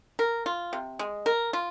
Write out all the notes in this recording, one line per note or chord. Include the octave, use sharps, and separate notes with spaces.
A#4
F4
C3
G#3
A#4
F4